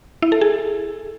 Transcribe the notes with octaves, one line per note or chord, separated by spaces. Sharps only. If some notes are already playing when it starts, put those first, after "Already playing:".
E4
A4
G#4